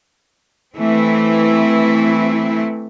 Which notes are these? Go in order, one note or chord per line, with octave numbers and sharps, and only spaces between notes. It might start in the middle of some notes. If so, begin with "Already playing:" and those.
E3 A3 C4 E4